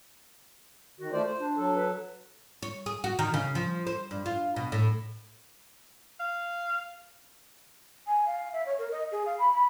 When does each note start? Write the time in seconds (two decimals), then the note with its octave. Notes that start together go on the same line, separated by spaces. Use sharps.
1.00 D#3 F#4
1.12 A3 F4 C5 D5
1.25 C5
1.39 D4
1.57 F#3 A4
1.76 B4
2.62 C#5
2.86 G#4
3.04 F#4
3.19 D#3
3.34 C#3
3.55 F3
3.87 C5
4.11 G2
4.26 F4
4.56 B2
4.72 A2
6.20 F5
8.08 G#5
8.26 F5
8.53 E5
8.66 C#5
8.79 A#4
8.92 D#5
9.12 G#4
9.26 F5
9.39 B5
9.53 B5